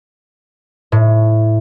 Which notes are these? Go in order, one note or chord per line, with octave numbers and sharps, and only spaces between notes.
A2